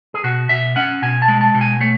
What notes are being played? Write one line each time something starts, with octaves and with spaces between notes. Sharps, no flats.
G#4
B2 F#4
B2 E5
C#4 F#5
B2 G#5
A5
G#3
A5
B2
G#5
A3 C#5